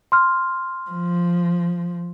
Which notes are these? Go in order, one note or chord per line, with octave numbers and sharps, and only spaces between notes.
C6 F6
F3